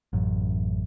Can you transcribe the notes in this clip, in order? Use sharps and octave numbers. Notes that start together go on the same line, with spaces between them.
A1 F#2